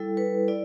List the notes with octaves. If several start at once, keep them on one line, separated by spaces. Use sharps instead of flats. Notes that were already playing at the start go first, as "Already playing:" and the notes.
Already playing: G3 E4 A4
B4
E4 D5